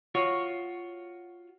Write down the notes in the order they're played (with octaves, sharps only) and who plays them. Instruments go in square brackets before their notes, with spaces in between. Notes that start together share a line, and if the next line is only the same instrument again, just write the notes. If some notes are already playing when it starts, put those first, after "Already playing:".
[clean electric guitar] F4 F#4 C#5